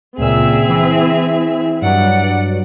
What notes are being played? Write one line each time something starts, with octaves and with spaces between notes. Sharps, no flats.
C#2 A#2 C4 G#4 E5 E6
E3
G2 F#3 B4 D5 F#5